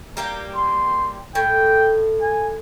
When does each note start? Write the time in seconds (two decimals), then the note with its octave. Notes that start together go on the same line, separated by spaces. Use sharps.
0.17 G3 A#3 G4 A#5
0.56 C6
1.35 A2 G5
2.21 G#5